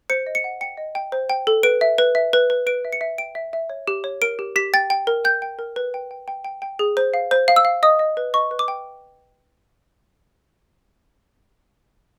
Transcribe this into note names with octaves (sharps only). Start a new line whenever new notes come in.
C5 C#7
D#5
C#7
F#5
G5 C#7
D#5
G5
C5
G5
A4
B4 D7
E5
B4
E5
B4
B4
B4 D7
E5
C#7
E5
G5 D7
E5
E5
C#5
G4
C#5
A#4 D7
G4
G4 B6
G5 A6
G5
A#4
G5 G6
G5
A#4
B4
G5
G5
G5
G5
G5
G#4
C5
F5
C5
F5
E6
F5
D#5 D#6
D#5
B4
D#5 C#6
B4
D6
G5